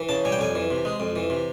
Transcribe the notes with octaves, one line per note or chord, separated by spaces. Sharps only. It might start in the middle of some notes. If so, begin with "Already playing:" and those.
Already playing: E3
C#3 A5
G3 G#5
G5
F2 G#5
E3
C3
G#3
F2
E3
C3